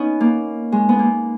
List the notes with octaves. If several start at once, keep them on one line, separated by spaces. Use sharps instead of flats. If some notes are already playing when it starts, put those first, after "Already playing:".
Already playing: B3 C#4 D#4
A#3
G#3
B3
A#3